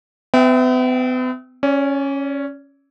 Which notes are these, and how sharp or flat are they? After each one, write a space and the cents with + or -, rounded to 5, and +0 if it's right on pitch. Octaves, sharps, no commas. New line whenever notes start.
B3 +45 E5 +0 G5 +0
C#4 -5 D5 -40